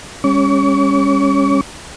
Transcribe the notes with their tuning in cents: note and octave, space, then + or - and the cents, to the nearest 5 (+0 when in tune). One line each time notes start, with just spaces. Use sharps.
G3 +45 C#4 +0 C#6 +45